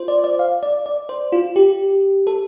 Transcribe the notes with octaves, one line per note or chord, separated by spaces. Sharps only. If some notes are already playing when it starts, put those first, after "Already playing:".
Already playing: F4 C5
D5
D5
F5
D5
D5
C5
F4
G4
A4